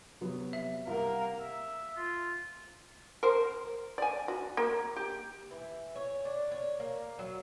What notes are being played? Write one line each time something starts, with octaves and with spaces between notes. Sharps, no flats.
C3 F#3 B3
E5
C2 A#3 A#4 F5 F#5
E5
F4
A#4 C5
D5 G#5
F#4
A#3
G4
E3
C#5
D4
C#5
A#3
F#3